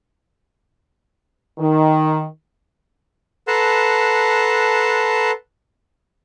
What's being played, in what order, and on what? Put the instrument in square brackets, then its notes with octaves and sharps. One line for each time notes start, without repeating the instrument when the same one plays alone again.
[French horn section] D#3
[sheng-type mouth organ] A4 B4 F#5 A5 A#5 C6